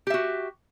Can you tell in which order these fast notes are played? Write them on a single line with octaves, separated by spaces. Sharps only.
G4 E5 F#4